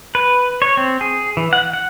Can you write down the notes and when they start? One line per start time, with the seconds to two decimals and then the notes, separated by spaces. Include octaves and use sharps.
0.15 B4
0.62 C#5
0.77 C4
1.01 G#4
1.37 E3
1.53 F#5
1.73 F#5